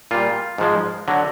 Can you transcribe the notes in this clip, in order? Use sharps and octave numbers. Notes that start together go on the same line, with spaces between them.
A#2 G3 F4
G#2 F3 G#3
D3 F#3